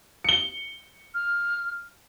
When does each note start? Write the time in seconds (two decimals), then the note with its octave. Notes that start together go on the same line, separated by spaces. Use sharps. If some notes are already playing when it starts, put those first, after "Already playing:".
0.24 C#7 G7
1.14 F6